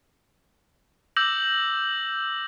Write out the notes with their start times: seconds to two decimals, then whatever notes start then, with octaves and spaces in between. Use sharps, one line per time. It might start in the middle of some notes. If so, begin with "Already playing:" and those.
1.16 D6 E6 G6 A#6 F#7